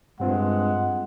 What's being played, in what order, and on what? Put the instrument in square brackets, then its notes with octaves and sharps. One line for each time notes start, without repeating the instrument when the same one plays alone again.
[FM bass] G2 [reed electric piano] G3 C4 F4 [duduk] G#3 [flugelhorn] F#5